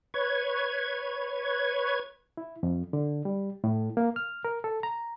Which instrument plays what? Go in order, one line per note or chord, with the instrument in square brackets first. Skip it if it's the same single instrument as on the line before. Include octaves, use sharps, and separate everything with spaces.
[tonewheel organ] B4 C#5 G#6
[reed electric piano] E4
F2
D3
G3
A2
A#3
F6
A#4
A4
A#5